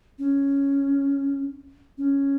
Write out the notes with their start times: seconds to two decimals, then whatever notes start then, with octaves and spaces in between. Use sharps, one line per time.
0.19 C#4
1.98 C#4